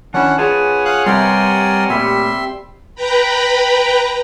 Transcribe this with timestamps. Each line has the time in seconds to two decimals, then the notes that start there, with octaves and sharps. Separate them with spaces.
0.14 D#3 C#4 D4 E4 F#5
0.38 F4 G#4 B4 C#5 F#5 G#5 A5
0.85 F5 D#6 F#6
1.06 C3 G3 A#4 B4 D5 G5 C6
1.90 A#2 G3 A3 E5 C6
2.95 B4 G5 A#5 B5